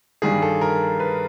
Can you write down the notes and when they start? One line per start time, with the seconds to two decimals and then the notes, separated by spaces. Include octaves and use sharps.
0.22 G2 D#3 G3 G#4
0.42 A4
0.61 A#4
1.00 B4